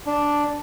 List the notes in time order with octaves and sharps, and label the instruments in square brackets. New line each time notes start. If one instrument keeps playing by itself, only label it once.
[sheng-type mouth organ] D4